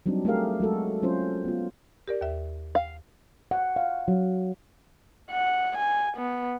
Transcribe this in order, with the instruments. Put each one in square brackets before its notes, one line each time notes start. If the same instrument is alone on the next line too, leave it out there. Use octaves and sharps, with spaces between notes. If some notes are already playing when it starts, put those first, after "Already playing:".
[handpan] F#3 G3 C4 D4 D#4
A3 G4 G#4 A#4 F5
F#3 G#3 F#4 A4
F#3 C4 C#4 F4 C5
B3 F4
[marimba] G4 A#4 D5
D#2 E5
[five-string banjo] F5
[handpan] F#5
F5
F#3
[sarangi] F#5
G#5
B3